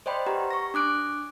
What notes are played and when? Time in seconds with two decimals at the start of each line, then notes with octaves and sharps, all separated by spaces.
0.06 C5 D5 D#5 G5 B5 C6
0.27 G4 B4 F#5 A#5
0.51 C#6 A#6
0.74 D4 D6 F#6 D7